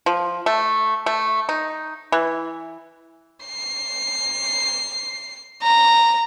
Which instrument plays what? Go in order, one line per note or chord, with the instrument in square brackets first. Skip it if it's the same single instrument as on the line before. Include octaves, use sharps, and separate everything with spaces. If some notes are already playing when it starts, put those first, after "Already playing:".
[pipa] F3
A3
A3
D#4
E3
[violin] C7
A#5